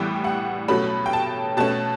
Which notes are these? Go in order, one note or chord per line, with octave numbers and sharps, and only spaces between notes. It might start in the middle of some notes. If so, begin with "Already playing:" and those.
Already playing: A2 E3 G3 B3 G5
F#5
B2 F#3 A3 C#4 B5
G5
A5
B2 A3 C#4 A5